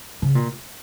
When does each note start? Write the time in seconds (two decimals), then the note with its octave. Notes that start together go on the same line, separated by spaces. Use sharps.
0.22 C#3
0.35 A#2